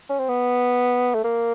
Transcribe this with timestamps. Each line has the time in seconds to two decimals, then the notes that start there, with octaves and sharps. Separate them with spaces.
0.09 C#4
0.19 C4
0.28 B3
1.15 A3
1.24 A#3